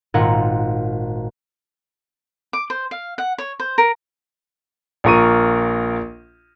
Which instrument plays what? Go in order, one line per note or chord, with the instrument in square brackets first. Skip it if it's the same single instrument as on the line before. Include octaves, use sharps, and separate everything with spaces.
[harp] G#1 A#2 F4 F#5 A#5 G#6
[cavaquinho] D6
C5
F5
F#5
C#5
C5
A#4
[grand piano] A#1 F4 A#4 C#6 D#7